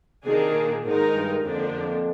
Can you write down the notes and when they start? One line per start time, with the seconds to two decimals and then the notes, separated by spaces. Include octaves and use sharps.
0.24 C3 D#3 A#3 D4 G#4
0.54 A#2
0.84 G#2 D#3 G#3 D#4 A#4
1.14 G2
1.44 F2 D3 F3 A#3 D4
1.73 F2